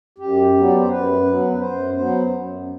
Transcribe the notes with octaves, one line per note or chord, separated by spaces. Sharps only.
F#2 G4
F#3 B3
D5
C5
F#2 B4
F#3 B3
B4
F#2 C5
F#3 B3 C5
F#2